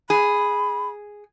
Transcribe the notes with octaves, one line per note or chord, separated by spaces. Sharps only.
G#4 B5